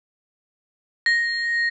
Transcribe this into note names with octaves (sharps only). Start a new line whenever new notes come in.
A#6